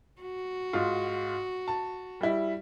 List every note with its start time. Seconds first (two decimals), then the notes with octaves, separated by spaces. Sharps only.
0.22 F#4
0.73 G#2 F4
1.68 A5
2.21 G3 E4